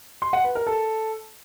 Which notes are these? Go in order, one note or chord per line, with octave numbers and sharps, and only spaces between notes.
C6
F#5
B4
A#4
A4